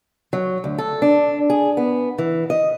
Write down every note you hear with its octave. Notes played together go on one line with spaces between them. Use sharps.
F#3
D2
A4
D4
G#4
B3
E3
D#5